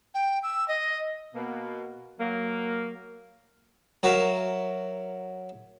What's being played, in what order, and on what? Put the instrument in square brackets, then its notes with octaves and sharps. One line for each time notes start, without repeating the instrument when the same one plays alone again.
[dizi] G5
E6
D#5
[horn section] B2 A#3
F#3 A#3
[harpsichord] F#3 F#4 A#4 E5 F5